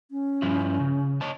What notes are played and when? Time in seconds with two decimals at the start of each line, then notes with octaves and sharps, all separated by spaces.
0.11 C#4
0.42 G2 F3 E4
0.80 C#3
1.21 C#5 D#5 A5